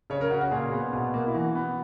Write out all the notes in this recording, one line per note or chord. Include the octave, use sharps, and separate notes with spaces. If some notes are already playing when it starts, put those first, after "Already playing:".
C#3 C#5
A#4
C#3 F#4
F#4
A#2 G#4
B3
B2
A#3
E4
E3 F#4
F#4
B3